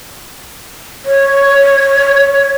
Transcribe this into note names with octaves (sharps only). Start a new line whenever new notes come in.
C#5